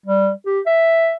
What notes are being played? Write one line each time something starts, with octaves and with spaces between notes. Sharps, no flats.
G3
G4
E5